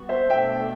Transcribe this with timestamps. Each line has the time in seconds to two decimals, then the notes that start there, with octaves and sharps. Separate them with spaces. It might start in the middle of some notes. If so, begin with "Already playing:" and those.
Already playing: G3 B3 F#4
0.09 C5 E5
0.30 B2 A3 D4 E5 G5